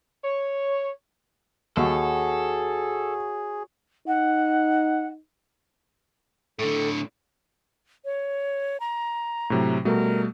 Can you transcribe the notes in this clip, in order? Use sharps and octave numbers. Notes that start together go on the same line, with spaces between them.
C#5
D#2 F#4 G#4 A4 C#5
D#4 F#5
A2 D3 A4
C#5
A#5
A2 C3 F#3
B2 G3 A3 A#4